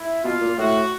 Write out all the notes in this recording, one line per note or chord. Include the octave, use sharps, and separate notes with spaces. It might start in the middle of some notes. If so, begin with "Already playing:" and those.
Already playing: E4
B2 F4
A#2
A2 F#4